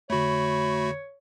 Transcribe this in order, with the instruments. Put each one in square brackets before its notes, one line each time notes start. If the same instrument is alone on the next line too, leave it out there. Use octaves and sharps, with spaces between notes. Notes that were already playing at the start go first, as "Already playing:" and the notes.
[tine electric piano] F2 D3 [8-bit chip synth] A3 F#4 [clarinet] C#5 [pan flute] B5